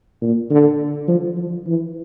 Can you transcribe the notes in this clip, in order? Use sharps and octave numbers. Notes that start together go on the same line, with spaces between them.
A#2
D3
F3
F3
E3